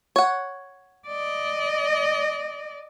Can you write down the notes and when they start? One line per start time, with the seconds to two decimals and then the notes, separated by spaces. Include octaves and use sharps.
0.16 C#5 F#5
1.08 D5 D#5